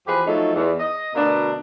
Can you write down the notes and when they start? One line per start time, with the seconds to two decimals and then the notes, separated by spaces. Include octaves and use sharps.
0.06 E2 F3 G4 G#4 B4
0.27 F3 F#3 A3 D#4 A4
0.54 E2
0.79 D#5
1.15 D2 B2 B3 D4 A#4